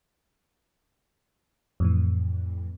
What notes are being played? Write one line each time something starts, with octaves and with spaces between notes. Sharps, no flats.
F2 A2 E3